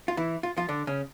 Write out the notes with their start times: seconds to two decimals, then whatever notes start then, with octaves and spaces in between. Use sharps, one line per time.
0.08 F4
0.17 E3 E4
0.43 F4
0.57 F3 F4
0.69 D3 D4
0.87 C#3 C#4